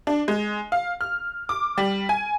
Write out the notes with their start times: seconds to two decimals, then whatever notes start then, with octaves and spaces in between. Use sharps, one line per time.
0.07 D4
0.28 G#3
0.72 F5
1.01 F6
1.49 D6
1.78 G3
2.09 G#5